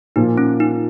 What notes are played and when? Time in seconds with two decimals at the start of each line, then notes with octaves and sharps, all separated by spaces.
0.16 A#2 F3 A#3 D#4
0.38 C#4
0.60 D#4